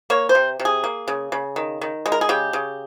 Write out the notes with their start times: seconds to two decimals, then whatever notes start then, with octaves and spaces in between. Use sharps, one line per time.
0.10 A#3 C#5
0.29 C5
0.35 C3
0.60 C3
0.65 G#4
0.84 A#3
1.08 C#3
1.32 C#3
1.56 D#3
1.81 D#3
2.06 G#3
2.12 A#4
2.21 G#4
2.29 C#3 G4
2.53 C#3